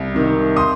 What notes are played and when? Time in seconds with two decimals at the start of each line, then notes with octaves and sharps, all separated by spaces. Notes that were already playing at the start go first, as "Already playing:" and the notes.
Already playing: C2
0.14 C3 D#3
0.56 C6 D#6